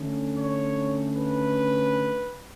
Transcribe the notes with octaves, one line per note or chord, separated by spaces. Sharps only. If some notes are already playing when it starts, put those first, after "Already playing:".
Already playing: D3 A3 C#4
C#5
B4